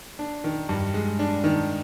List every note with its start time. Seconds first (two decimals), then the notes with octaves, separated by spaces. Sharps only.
0.19 D4
0.44 D#3
0.69 G2
0.94 G#3
1.19 D4
1.44 D#3